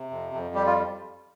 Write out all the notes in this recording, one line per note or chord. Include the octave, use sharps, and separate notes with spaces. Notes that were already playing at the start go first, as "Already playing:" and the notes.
Already playing: C3
F2
F2
G3 G4
F4